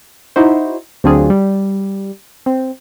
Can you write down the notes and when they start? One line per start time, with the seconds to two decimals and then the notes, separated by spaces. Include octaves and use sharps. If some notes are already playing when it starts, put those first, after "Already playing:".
0.36 D#4 E4 F#4 C5
1.04 D2 F#3 C4 D4 F4 G#4
1.30 G3
2.46 C4